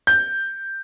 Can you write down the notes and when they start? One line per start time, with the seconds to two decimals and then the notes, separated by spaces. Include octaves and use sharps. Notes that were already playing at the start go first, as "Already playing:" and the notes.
0.07 G6